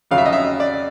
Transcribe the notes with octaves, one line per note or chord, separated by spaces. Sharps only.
F2 C#3 F#3 F5
E5
D#5
E5
D5